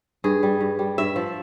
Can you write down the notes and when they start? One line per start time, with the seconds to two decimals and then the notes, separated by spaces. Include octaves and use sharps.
0.24 G2 G#4
0.43 G3
0.61 G2
0.79 G3
0.98 G2 E5
1.16 F3